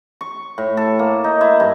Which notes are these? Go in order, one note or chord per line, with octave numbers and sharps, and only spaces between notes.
C#6
A2
A4
A#3
D#4
E4
G2